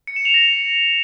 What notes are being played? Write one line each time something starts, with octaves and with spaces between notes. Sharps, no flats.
C#7
E7
F7
A#6